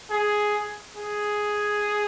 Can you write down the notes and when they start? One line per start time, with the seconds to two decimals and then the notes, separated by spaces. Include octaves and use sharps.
0.11 G#4
0.97 G#4